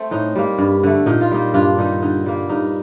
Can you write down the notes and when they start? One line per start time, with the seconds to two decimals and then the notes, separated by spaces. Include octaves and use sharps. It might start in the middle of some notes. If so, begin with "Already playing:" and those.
Already playing: A3 C4
0.11 A2 D#4
0.36 G3 A#3
0.59 G2
0.83 D3 A3
1.06 A#2 D#4
1.21 F4
1.31 G3 A#3 D#4
1.54 G2 D4 F4
1.78 D#3 G3 D#4
2.02 D3 D#4
2.26 G3 A#3
2.49 G2 D#4